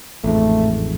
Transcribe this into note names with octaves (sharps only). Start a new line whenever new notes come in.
A1 F2 G#2 A3